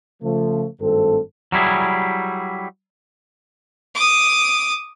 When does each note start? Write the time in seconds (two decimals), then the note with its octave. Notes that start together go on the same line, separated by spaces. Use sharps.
0.22 C#3 F3 A3
0.81 G#1 G2 A3 C4 A4
1.52 F#3 G3 E4 G#4
3.95 D6 D#6